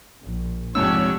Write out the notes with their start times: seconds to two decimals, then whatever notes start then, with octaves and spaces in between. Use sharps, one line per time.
0.22 A#1
0.75 F2 G#2 C3 D4 G4 C#5 E6